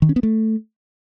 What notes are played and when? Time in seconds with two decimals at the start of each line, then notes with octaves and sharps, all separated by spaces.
0.02 D#3
0.09 C#4
0.16 B3
0.23 A3